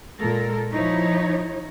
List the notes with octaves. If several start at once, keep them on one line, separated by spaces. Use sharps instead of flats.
A#2 G#3 A4 A#4
F3 D#4 E4 C#5